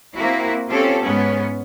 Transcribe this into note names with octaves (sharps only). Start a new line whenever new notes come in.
A#3 C4 E4 F#4
C4 C#4 F4 G4 A4
G#2 B3 C#4